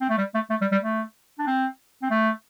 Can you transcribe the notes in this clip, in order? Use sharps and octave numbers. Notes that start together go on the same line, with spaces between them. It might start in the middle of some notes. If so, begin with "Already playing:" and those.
C4
A3
G3
A3
A3
G3
G3
A3
D4
C4
C4
A3